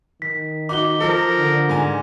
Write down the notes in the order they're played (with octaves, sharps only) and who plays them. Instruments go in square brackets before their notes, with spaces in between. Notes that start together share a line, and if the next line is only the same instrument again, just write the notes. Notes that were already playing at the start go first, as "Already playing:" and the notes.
[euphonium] D#3 [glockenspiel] B6
[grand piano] D#4 F#4 [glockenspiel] D6 G7
[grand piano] F3 A4 [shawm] A#4
[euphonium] D3
[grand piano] G#2 G#5